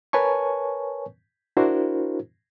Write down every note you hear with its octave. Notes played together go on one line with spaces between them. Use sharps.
A#4 B4 C#5 G#5 A5 C#6
D4 E4 F#4 A#4 C5